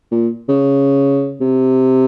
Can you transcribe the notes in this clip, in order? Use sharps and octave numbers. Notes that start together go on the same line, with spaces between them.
A#2
C#3
C3